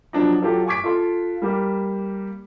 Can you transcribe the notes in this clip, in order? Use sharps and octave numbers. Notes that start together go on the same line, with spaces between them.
F3 F#3 D4 D#4
F#3 F4 G4 A4
G#5 C#6 D6 G#6 B6 D7
F4 A4 C6
G3 A#3 G4